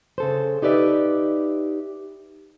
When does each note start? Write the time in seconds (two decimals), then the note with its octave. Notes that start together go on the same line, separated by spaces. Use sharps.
0.18 C#3 A4 C5
0.62 D#4 G4 B4 D5 E5